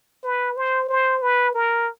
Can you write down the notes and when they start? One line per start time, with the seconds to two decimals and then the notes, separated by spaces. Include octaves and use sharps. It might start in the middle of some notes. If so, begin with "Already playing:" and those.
0.24 B4
0.57 C5
0.89 C5
1.22 B4
1.54 A#4